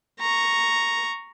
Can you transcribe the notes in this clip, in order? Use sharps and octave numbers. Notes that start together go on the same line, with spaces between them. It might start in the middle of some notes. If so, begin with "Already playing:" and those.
A#5 C#6